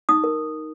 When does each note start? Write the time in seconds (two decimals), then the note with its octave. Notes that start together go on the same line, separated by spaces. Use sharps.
0.09 D#4 D#6
0.24 A#4